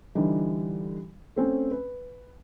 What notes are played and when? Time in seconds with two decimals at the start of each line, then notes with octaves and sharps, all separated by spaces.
0.15 D3 E3 G3 D#4
1.36 A3 C4 C#4
1.71 B4